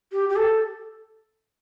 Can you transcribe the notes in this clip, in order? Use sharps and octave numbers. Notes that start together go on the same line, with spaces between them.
G4
G4
A4